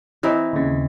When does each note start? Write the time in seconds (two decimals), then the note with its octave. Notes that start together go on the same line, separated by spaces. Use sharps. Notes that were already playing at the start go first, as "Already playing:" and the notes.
0.23 E3 C4 D#4
0.53 D#2 C#3